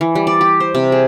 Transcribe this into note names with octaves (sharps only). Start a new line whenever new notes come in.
E3
G3
D5
G4
C5
C3
G#4